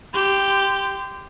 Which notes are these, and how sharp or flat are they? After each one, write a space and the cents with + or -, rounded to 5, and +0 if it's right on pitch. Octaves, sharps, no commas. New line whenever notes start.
G4 +0 C6 -25